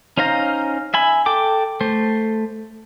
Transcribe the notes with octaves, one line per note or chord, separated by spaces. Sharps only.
C#4 D#4 C5 F5 A#5
E5 G#5 B5
A4 G5 D6
A3 C5